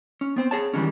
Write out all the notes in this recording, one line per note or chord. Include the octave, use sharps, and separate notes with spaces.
C#4
B3 C4 C5
G#4 C#5 A5
D#3 E3 G3 G#3 C#4